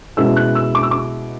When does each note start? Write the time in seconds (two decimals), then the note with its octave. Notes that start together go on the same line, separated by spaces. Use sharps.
0.17 B2 G#3 C#4 E4 E6
0.36 F#6
0.55 E6
0.75 D6
0.83 E6
0.91 D6